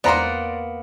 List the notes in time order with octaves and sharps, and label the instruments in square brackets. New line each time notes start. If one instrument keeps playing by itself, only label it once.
[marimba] E2 C5 [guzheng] A#3 B3 [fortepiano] D5 A#5 C6